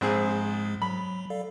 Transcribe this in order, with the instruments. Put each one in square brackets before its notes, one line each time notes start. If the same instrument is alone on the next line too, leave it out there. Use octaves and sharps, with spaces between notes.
[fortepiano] A#1 C4 G#4 [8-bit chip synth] G#2 G#3
[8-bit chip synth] F#3 [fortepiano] B5
[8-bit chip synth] A4 D5 F5